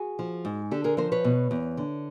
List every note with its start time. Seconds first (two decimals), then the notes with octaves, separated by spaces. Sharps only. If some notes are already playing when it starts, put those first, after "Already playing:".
Already playing: F#4 G#4
0.19 F3
0.45 G#2
0.71 D3 G4 A4
0.84 G#4 A#4
0.97 F3 A#4 C5
1.12 B4 C#5
1.24 B2
1.51 E2
1.77 D3